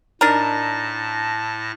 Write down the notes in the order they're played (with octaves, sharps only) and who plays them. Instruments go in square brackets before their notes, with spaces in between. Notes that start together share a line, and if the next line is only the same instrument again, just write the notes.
[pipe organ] A2 A5 A#6 [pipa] D4 D#4 A#4